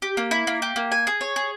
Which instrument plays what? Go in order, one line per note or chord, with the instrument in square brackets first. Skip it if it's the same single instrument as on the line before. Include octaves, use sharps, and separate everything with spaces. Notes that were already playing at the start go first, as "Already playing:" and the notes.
[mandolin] G4
A#3
E4
A#3
G4
A#3
G#5
G#4
C#5
G#4